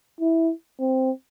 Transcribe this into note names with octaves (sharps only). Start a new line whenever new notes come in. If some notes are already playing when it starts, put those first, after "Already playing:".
E4
C4